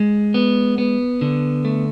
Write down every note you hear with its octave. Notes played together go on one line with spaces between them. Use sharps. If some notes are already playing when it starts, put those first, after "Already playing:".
Already playing: G#3
B3
B3
D3
A3